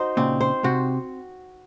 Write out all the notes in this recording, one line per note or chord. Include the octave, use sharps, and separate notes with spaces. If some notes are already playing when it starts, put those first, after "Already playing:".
Already playing: D#4 F#4 C5
A#2 C#3 C4
C5
C3 F#4